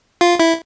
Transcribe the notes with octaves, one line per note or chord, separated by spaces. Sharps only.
F4
E4